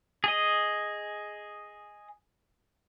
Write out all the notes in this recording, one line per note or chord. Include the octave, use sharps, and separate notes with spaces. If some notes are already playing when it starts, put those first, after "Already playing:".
G#4 D#5